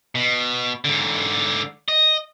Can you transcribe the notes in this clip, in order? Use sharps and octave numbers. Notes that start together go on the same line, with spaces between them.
B2
G#2 D3
D#5